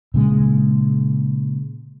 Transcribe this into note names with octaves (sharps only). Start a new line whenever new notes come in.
A#2 C#3 G#3